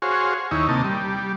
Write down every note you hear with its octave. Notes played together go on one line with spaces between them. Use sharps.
F#4 G#4 C5 C#5 F5
D#2 D#4 E4 C#5
C3 A#3 D#5 A5
G3